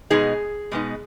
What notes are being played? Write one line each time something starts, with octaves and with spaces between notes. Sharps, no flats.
B2 G#3 B3 D#4 G#4
B2 G#3 B3 D#4